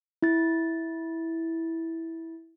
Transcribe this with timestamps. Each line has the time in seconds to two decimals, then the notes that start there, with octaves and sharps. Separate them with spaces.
0.22 E4 A6